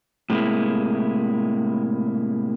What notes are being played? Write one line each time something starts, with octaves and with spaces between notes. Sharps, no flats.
A2 C3 G#3 A#3 E4